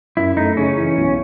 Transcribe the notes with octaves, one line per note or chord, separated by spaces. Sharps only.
F#2 E4
A3 D#4
C#3 C#4
E3
B1